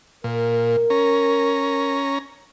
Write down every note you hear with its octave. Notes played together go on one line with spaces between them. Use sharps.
A#2 A#4
C#4 A#5